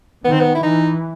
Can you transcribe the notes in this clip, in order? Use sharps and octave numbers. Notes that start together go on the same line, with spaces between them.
D#3 B3
C4
B3
E4
E3 D#4